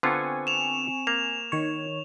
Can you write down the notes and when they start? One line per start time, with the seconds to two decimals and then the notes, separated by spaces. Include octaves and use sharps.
0.03 D3 B3 C4 F4 G#5 C#6
0.47 E7 F7
1.07 A#3 F7
1.52 D#3 C#5